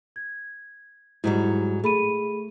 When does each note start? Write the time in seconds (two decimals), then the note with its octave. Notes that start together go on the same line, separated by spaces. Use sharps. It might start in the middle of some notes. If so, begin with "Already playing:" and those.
0.16 G#6
1.24 G#2 F#3 G3 E4
1.84 A3 G#4 B5 D#7